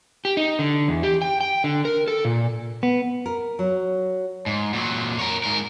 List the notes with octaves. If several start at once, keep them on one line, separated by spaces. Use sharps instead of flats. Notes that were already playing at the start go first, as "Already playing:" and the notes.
G4
D#4
D3
E2
G4
G5
G5
D3
A#4
A4
A#2
B3
A#4
F#3
G#2
A#2 F#3
A#4 C#5
G#2 A#4